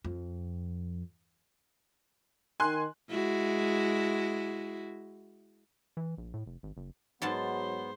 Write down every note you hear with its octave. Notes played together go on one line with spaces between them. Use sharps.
F2
D#3 G#5 C6 F#6
G#3 E4 F#4
E3
A#1
A2
F1
G#1
F#1
G#2 F#3 B3 C5 F#5 A5